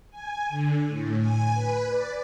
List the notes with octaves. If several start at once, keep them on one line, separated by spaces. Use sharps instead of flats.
G#5
D3
A2
G#5
B4
D5